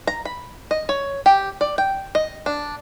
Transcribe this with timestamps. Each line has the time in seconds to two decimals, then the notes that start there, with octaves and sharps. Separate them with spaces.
0.07 A#5
0.25 B5
0.71 D#5
0.89 C#5
1.26 G4
1.61 D5
1.78 G5
2.15 D#5
2.46 D4